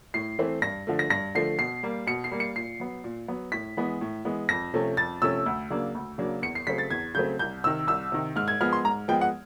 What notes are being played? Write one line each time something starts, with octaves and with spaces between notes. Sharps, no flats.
A2 C7
E3 A3 C4
G2 A#6
D3 F3 A3
A#6
G2 A#6
D3 F3 A3 C7
B2 C7
G3 A#3
B2 C#7
C7
G3 A#3
C#7
A#2 C7
F#3 B3
A#2
F#3 B3
A2 B6
E3 G#3 B3
A2
E3 G#3 B3
F2 A#6
C3 F3 A3 C#4
F2 A6
C3 F3 A3 C#4 E6
D2
C#3 F#3 A#3 D4
D2
C#3 F#3 A#3 D4
E2 C#7
C7
C#3 F#3 A3 C4 B6
A6
E2 G#6
C#3 F#3 A3 C4 G6
C2 G6
C3 D#3 E6
C2 E6
C3 D#3
G#2 F6
G#6
F3 G#3 B3 F6
C6
G#2 A#5
F3 G#3 B3 G5
F#5